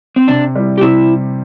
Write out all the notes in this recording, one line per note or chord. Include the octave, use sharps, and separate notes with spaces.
C4
C3 D4
G3 E4
G4
C3 E4